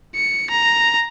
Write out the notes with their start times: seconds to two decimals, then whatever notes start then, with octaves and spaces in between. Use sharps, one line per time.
0.15 C#7
0.50 A#5